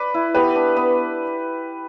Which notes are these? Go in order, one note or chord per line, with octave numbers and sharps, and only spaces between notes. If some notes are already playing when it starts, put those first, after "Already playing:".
Already playing: B4 D5
E4
B3 G4 B4
D4
B3